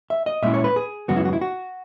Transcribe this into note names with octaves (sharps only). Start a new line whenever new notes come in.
E5
D#5
A#2 G#3 C#4 E4 E5
C#5
B4
G#4
F#2 C#3 G#3 B3 F#4
E4
F#4
E4
F#4